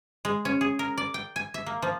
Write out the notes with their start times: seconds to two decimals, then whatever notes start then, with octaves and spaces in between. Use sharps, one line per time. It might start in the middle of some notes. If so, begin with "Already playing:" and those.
0.25 G#3
0.45 C#4
0.61 G#4
0.79 A#4
0.98 D5
1.14 G5
1.36 G#5
1.54 E5
1.66 A#3
1.82 F3